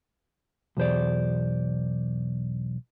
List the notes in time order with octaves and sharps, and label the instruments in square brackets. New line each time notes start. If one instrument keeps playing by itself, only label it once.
[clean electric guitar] B1 E2 C5 D5